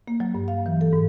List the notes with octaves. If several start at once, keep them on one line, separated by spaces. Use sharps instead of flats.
A#3
F#3
G2
F5
E3
A4
G#2